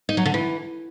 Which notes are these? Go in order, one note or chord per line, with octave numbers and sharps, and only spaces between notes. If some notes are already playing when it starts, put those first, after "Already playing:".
D#4
F#3
D3
E3